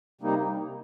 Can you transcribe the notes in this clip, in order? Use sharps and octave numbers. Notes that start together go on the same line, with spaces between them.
C3 G3 A#3 D#4